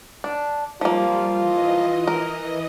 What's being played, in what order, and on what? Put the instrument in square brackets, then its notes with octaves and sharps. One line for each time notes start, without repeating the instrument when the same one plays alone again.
[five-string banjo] D4
[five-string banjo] F3 A#3 [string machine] G3 [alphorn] F4
[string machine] E3 D#5
[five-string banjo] A#4